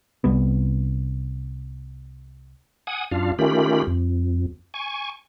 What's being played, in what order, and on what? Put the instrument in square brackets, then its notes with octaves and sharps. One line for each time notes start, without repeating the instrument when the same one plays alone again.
[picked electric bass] C2 G3 B3
[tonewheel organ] F#5 G#5 D#6
F#2 D4 F4 F5
D#3 A3 C#4 F4 G4 B5
F2
G#5 C#6